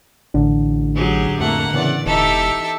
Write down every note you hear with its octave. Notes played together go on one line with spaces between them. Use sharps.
A1 A2 D3 D4
F#3 G4 G#4
F2 A3 A#3 F#5
E2 C#3 D5
E1 D#4 G4 A4 E5